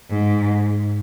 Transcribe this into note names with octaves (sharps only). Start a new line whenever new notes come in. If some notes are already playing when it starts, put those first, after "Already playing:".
G#2